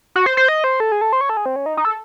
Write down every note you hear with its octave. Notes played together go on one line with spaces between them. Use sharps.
F#4
C5
C5
D#5
C5
A4
G#4
A4
C5
C#5
A4
G#4
C4
C#4
D#4
D#4
A4